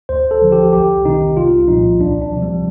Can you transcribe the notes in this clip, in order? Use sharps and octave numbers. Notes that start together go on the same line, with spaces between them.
D2 C5
A4
D3 F3
G4
C2 G4
C3 D#3 D#4
C2 F4
A#2 F3 D#4
D2 D4
D4
C3 F3
G3